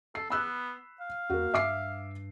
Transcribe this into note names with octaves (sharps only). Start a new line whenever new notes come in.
A4 C7
B3 B5 E6 F#6
F5
E2 A#3 F#4
G2 E5 D6 C7